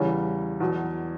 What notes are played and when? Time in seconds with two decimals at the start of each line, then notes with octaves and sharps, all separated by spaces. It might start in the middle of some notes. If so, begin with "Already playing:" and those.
Already playing: E2 C#3 E3 G3 C#4
0.60 E2 B2 F#3